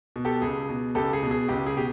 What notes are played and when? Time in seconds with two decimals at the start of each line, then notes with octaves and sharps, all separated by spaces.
0.16 B2
0.25 G4 A4
0.42 C#2 G#4
0.69 B2
0.95 C#2 G4 A4
1.13 G#4
1.23 B2
1.31 G#4
1.48 C#2 G4
1.66 G#4
1.76 B2 G4